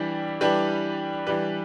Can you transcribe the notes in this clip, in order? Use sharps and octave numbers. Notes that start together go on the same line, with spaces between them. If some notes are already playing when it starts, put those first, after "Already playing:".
Already playing: E3 G3 D4 G4
E3 G3 D4 G4 B4
E3 G3 D4 G4 B4